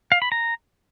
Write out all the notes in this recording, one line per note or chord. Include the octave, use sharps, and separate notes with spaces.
F5
B5
A#5